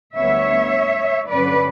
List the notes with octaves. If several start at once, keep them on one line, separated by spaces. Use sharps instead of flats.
D2 D3 G3 B3 C#5 E5
G2 D3 F#3 C#4 B4 D5